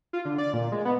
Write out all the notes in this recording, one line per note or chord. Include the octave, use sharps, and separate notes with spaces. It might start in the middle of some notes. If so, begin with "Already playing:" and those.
F4
D3
D5
A#2
G#3
B3